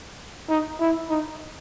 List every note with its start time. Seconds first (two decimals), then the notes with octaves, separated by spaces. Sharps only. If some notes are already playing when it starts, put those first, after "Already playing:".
0.49 D#4
0.80 E4
1.09 D#4